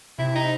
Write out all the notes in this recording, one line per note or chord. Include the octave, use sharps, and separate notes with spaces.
C3 E4
D#4